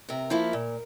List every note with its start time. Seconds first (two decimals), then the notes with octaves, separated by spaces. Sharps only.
0.09 C3 A#4
0.30 F3 A#3 E4
0.53 A#2